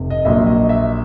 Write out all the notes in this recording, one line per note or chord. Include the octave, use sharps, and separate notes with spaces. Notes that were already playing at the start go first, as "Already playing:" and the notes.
Already playing: F1 C3
D#5
A#1 A#2 F#3 E5
D#5
E5